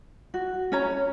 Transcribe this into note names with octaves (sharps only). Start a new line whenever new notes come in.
F#4
C#4 C#5 A#5